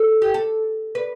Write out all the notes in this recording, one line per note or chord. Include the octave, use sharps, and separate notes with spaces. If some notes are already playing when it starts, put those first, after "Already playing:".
Already playing: A4
G4
A4
B4